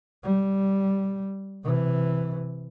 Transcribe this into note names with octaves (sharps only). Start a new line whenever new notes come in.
G3
C3 E3